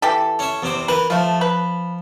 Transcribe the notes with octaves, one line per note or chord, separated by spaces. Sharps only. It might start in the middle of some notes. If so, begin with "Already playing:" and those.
E3 G4 A4
C#4 E5
E2 C3 C5
E3 A#4 B4
F3 A3 F4
B4